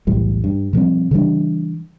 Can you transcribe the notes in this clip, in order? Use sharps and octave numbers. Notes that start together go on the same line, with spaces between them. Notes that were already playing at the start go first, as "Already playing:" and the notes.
B1 E2 A2 G3
G2
B2 F3 G3 C4
C#3 E3 G3 D4